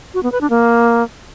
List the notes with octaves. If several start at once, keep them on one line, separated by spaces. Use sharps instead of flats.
F#4
B3
B4
D4
A#3